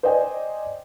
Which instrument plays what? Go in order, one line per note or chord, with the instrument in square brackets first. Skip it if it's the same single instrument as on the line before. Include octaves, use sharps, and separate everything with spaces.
[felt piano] C5 D5 D#5 G5 G#5